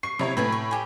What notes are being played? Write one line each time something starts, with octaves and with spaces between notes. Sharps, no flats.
C#6 C7
C3 E4 C#5
A2 B4 G#5 A5
C#6
G4 G#5